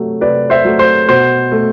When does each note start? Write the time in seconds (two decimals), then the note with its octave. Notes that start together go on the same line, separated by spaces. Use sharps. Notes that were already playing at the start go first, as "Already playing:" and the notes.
Already playing: C3 F#3 A3
0.21 C3 B4 D5
0.50 C5 E5
0.64 F#3 A3
0.79 C5
1.09 B2 C5
1.52 A3